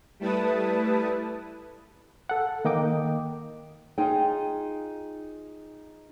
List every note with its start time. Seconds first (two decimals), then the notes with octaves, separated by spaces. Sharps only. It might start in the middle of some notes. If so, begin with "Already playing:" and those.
0.19 G3 A3 E4 B4 A5 D#6
2.29 A4 F#5
2.65 D#3 A#3 D#5 G5 D6
3.98 D#4 F4 G#4 G5